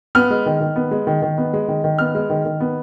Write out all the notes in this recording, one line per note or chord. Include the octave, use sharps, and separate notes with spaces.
B3 F6
G#3
D#3
D#3
B3
G#3
D#3
D#3
B3
G#3
D#3
D#3
B3 F6
G#3
D#3
D#3
B3